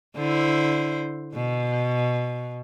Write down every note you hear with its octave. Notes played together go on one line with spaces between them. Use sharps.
D3 E4 C5
B2